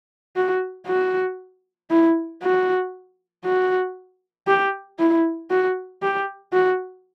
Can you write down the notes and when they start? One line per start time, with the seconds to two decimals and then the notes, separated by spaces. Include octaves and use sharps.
0.36 F#4
0.87 F#4
1.90 E4
2.42 F#4
3.45 F#4
4.47 G4
4.99 E4
5.50 F#4
6.02 G4
6.53 F#4